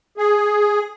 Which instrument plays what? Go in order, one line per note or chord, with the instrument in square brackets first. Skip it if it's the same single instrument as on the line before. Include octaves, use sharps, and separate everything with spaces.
[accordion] G#4